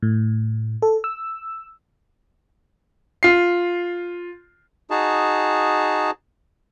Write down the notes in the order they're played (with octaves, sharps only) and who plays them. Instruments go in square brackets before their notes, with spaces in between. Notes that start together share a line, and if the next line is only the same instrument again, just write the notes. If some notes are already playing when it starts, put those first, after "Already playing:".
[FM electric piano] A2
A4
E6
[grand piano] F4 C7
[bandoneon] D#4 F#4 G#4 A5